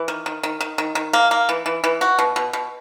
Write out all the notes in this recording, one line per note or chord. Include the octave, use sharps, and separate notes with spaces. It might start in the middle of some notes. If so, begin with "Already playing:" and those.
Already playing: E3
D#3
D#3
D#3
D#3
D#3
D#3
A#3
A#3
E3
E3
E3
F#4
B2
B2
B2